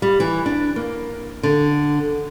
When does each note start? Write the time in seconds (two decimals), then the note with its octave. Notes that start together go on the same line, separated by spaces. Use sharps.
0.02 G3
0.20 E3
0.46 D4
0.76 A#3
1.43 D3